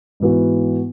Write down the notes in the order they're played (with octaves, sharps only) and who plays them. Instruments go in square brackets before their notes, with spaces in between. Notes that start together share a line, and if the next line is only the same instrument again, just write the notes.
[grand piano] G#2 E3 B3 F#4